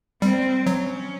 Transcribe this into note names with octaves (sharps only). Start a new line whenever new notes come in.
G3 C4
F#3 C#4